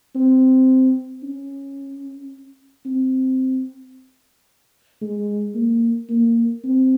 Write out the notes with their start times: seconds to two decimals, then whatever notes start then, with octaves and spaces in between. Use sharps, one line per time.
0.15 C4
1.23 C#4
2.85 C4
5.01 G#3
5.55 A#3
6.09 A#3
6.64 C4